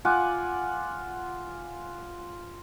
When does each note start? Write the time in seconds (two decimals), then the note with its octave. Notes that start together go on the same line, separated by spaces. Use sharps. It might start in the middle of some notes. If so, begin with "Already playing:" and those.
0.05 F4 F#5 G#5 D6